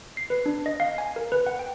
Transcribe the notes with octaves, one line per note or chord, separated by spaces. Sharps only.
C7
B4
D4
D#5
F5
G#5
A#4
B4
F#5
G5